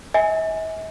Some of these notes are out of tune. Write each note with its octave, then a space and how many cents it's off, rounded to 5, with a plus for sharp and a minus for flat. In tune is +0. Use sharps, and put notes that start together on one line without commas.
E5 -45 G#5 +0